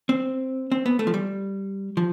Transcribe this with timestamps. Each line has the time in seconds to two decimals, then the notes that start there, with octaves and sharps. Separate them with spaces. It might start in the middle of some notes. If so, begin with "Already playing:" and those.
0.09 C4
0.72 C4
0.86 B3
0.99 A3
1.07 F3
1.14 G3
1.97 F3